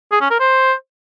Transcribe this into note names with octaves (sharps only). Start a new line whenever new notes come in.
G#4
C#4
A#4
C5